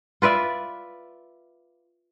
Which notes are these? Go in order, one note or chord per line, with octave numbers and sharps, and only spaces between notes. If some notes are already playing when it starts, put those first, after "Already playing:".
F4 B4 D5 E5